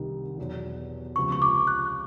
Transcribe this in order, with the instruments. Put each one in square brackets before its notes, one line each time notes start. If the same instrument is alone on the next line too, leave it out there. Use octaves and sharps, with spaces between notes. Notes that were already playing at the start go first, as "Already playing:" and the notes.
Already playing: [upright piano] C2 C3 D#3
E2 B2 F#3
[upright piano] C#2 C3 F3 [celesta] C#6
[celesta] C#6
D6
F#6